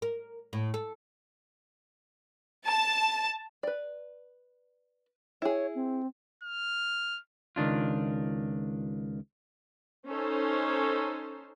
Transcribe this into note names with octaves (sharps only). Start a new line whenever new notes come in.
A#4
A2
A4
A5
B4 D5
E4 G#4 C#5
C4
F6
C#2 D#3 D4 F4
C#4 D#4 A4 C5